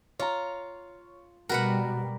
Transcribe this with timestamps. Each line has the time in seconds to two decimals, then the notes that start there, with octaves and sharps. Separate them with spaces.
0.20 F4 C#5 A#5
1.49 B2 G3 F#4 A#4 B4 F#5